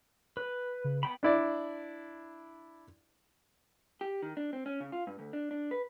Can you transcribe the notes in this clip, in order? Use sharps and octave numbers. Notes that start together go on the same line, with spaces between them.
B4
C#3
B3 G5 B5
D4 E4 D5
G4
D#3
D4
C4
C#4
C#3
F4
G2
D2
D4
D4
B4